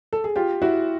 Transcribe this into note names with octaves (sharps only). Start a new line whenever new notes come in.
A4
G#4
F4 G4
E4 F#4